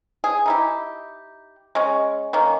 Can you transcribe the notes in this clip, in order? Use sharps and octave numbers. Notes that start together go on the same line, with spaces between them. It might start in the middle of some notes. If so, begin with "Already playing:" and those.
G#4
D#4 E4 G4
G#3 C#4
D#3 A#3 C#4